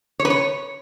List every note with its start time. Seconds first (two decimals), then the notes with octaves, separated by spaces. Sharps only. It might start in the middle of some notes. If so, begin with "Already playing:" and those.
0.19 C#5
0.25 B4
0.30 C#5